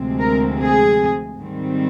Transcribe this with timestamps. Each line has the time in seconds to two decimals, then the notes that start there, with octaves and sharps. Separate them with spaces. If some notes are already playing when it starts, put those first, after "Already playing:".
Already playing: D2 C3 F3 G#3 C4
0.20 A#4
0.59 G#4
1.38 G#2 D#3 G3 C4